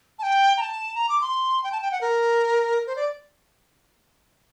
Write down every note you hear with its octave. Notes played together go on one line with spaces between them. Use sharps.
A5
G5
A#5
A5
A#5
D6
C6
G5
A5
G5
F#5
A#4
C5
D5